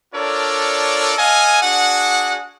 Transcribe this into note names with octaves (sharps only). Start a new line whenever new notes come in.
D4 F4 A4 A#4 C#5 D5
A4 D#5 F5 G#5
D4 F#4 G#4 F#5